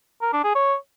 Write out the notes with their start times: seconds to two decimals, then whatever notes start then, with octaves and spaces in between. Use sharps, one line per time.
0.22 A#4
0.33 D4
0.44 G#4
0.55 C#5